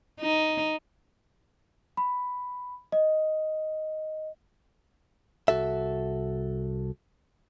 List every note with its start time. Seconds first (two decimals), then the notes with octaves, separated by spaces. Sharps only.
0.21 D#4
1.97 B5
2.92 D#5
5.48 C2 F#4 A4 E5